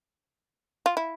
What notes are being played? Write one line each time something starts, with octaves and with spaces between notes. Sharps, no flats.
F4
E4